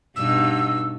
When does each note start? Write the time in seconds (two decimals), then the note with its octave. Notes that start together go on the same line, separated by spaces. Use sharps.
0.16 G2 B2 D#4 E6